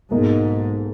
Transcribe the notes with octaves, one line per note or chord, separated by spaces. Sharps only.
B1 G#2 B2 A#3 D#4